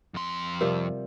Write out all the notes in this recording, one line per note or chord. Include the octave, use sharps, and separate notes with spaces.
F2 C6
C3 F3 G3 A#4